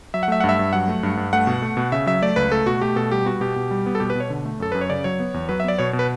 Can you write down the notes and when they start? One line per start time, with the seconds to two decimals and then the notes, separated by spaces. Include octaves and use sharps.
0.14 F#3 E5
0.23 F#5
0.28 A3 E5
0.40 G2 F#5
0.49 E5
0.59 G2
0.73 F#3 F#5
0.88 A3
1.03 G2
1.17 G2
1.33 A3 F#5
1.47 B2
1.62 A3
1.77 B2
1.92 C#3 E5
2.07 F#3 E5
2.22 A3 D5
2.36 C#2 B4
2.52 A3 A4
2.66 B2 F#4
2.81 A3 G4
2.96 B2 A4
3.12 G3 G4
3.26 B3 F#4
3.41 B2 G4
3.56 B2
3.71 G3
3.86 B3
3.95 A4
4.00 B2 G4
4.10 B4
4.15 B2 C#5
4.30 D3
4.45 A3
4.60 F#2 A4
4.72 F#2 B4
4.81 C#5
4.90 C#3 D5
5.04 F#3 C#5
5.20 B3
5.34 E2
5.49 F#3 B4
5.60 E5
5.64 B3 D5
5.78 B2 C#5
5.93 B2
5.99 B4